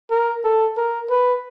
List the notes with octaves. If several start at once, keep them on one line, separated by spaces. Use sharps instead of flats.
A#4
A4
A#4
B4